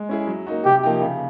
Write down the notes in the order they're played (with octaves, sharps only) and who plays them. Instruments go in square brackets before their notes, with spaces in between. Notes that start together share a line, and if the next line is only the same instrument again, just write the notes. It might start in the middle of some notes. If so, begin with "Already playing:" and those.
Already playing: [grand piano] G#3
C#4 E4 G#4
F#3
A#3 D#4 F#4
[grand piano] C3 [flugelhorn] G4
[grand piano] F3 A#3 D#4 G4
C#3